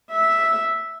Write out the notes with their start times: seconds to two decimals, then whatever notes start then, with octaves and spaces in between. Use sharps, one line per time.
0.12 E5